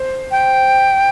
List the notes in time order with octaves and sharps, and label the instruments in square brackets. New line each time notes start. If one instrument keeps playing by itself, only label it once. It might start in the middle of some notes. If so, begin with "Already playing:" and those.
Already playing: [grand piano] C5
[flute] G5